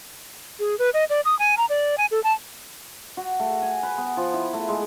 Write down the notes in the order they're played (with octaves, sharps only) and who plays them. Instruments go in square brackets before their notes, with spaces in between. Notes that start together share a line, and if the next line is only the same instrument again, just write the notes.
[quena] G#4
B4
D#5
D5
D#6
G#5
A#5
D5
G#5
A4
A5
[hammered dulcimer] F#4
A3
G#5
B4
B3
F3
E4
A3
G#3